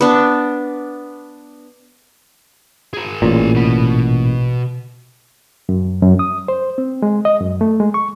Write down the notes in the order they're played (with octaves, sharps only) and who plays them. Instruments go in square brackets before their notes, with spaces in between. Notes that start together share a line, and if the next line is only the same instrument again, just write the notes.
[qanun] B3 D4
[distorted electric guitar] G#4 A#4
[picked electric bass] A1 A#2
[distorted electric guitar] B2 B5
[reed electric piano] F#2
F#2
D#6
C5
C4
G#3
D#5
F#2
A3
G#3
C#6